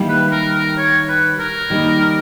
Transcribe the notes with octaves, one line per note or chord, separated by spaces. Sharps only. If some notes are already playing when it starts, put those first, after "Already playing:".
Already playing: D#3 G3 A#3 E4
B4
A#4
A#4
C#5
B4
A#4
D#3 G3 A#3 D#4